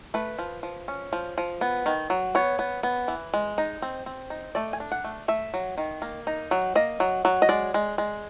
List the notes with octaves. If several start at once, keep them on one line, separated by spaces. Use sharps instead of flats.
A3 B4
F3
F3
C#4
F3
F3
B3
D#3
F#3
B3 C#5
B3
B3
E3
G#3
D#4
C4
C4
D#4
A3 D5
G#5
D4
F#5
A3
A3 E5
F#3
D#3
A#3
D#4
F#3
A#3 D#5
F#3
F#3
D#5
G#3 D5
G#3
G#3